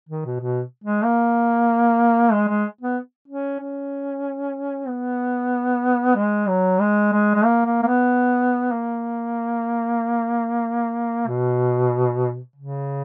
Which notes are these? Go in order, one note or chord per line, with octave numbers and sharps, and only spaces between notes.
D#3
B2
B2
G#3
A#3
G#3
G#3
B3
C#4
C#4
B3
G#3
F#3
G#3
G#3
G#3
A#3
A#3
A#3
B3
A#3
B2
C#3